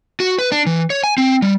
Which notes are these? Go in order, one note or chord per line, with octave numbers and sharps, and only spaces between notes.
F#4
B4
D4
E3
C#5
G#5
C4
G3